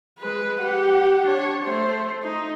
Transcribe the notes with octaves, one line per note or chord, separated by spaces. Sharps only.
G#3 B4
G4 F#5
D4 C#5
A3 C5
D#4